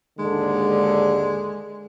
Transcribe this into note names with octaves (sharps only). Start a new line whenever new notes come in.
D#2 G#2 D3 G#3